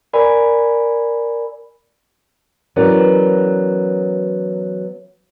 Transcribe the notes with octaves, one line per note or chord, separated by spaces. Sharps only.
A#4 D5 G#5 B5
E3 F#3 B3 C#4 A#4 D5